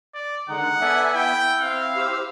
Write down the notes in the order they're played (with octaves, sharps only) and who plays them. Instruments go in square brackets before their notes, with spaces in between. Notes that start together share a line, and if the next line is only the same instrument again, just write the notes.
[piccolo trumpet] D5
[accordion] D3 D#3 G#3 [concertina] D#4 [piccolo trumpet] F#5
[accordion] B3 E5 G#5 [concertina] A4 D5
[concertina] E4 [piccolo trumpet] G5
[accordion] C4 [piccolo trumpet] F5
[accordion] G4 C5 E6